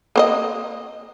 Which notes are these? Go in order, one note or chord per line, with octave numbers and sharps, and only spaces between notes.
A#3 C5 D#5